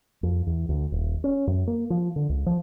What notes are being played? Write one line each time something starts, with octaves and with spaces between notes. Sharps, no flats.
F2
E2
D2
D#1
C#4
F#2
A#3
F3
D3
C#2
F3